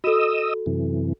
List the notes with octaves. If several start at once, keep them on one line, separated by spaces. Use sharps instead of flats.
F#4 A4 D#5 D#6 E6
F#2 C3 E3